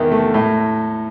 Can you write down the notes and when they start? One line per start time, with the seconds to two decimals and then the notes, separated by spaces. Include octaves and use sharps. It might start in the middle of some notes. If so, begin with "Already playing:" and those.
Already playing: E2 D#3
0.12 A3
0.34 A2